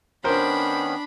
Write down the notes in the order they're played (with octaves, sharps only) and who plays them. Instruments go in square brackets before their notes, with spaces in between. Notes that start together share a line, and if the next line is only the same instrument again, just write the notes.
[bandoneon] D#3 B3 C#4 [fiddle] D4 B5 [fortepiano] A#4 C5